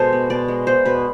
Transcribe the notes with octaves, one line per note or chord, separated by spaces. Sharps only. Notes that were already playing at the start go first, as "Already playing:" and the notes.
Already playing: B2 G#3 A4 C5
B3
B2 D5
G#3
B3 C5
B2 B4